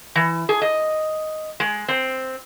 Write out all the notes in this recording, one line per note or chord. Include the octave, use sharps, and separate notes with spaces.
E3
G#4
D#5
G#3
C4